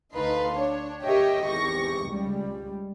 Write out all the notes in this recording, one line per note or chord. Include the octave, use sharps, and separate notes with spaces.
D2 D#4 A4 B4 F5 C6
D4 C#5
G4 A#4 C#5 D#5 E5 G5
G#1 E2 G4 C#6 A#6
C#2 G3